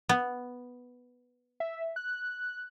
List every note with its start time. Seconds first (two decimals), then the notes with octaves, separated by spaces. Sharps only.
0.09 B3
1.60 E5
1.96 F#6